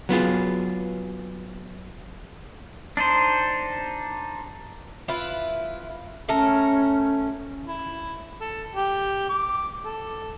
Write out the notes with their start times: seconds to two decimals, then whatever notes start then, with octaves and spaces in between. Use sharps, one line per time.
0.09 F#3 B3 F4 G#4
2.97 D4 D#4 C5
5.08 E4 F4 B4
6.28 A3 C#4 A4 A#4
7.67 E4
8.41 A4
8.75 G4
9.30 D6
9.84 A4